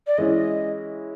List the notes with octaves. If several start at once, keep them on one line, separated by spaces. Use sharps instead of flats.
D5
E3 G#3 C#4 E4 D#5